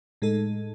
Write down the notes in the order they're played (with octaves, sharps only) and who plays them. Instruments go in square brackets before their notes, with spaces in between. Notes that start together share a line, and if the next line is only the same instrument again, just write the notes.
[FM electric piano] A2 G#3 D#4 A4